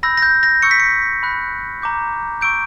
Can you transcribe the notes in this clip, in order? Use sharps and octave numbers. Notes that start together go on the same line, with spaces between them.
B5 E6 G6 A#6
A#6
G6
A#6
C#6 E6 G6 C#7
B6
C#7
B5 F#6
A#5 D6 G6
C#6 E6 G6 D7